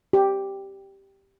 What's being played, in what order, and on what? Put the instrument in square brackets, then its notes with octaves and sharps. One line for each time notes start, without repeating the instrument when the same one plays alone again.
[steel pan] G4